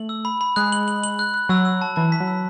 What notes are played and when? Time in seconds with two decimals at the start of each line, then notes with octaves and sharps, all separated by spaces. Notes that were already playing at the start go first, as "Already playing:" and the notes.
Already playing: A3 F#7
0.09 E6
0.25 B5
0.41 B5
0.56 G#3 F#6
0.72 F#7
0.88 F#7
1.04 F#7
1.19 F#6
1.34 F#6
1.49 F#3 E6
1.65 E6
1.82 A5
1.96 E3 A5
2.12 B6
2.20 F#3
2.27 E6